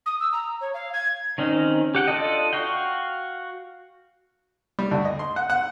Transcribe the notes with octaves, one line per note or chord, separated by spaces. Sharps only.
D#6
E6
A#5
C#5
F5
G#6
D#3 C4 C#4 D#4
G4 F#5 G5
D4 F4 A4 D#5
F#4 F5 G5
G3
D2
D#5
C6
F#5
F#5